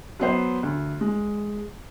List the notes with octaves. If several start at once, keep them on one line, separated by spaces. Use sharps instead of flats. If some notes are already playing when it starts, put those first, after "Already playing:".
F#3 B3 C5
D2
G#3